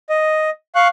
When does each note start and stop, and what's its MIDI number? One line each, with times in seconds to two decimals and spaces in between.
0.10 0.50 75
0.75 0.88 77
0.75 0.88 85
0.75 0.88 90